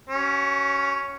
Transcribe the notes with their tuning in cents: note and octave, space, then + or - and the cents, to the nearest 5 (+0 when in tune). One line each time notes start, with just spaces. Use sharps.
C#4 +5 F#4 +35